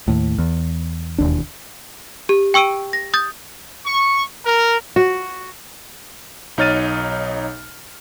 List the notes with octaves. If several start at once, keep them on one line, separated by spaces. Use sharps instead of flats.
D#2 A2
E2
E1 D#2 D4
G4
G5 C#6 E6 D7 D#7
A#6
D#6 G6 A6
C#6
A#4
F#4
B1 D#4 C#5 F6 A6 D#7